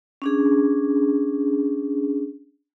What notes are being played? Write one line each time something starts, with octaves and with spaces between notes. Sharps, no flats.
C#4 D4 G#4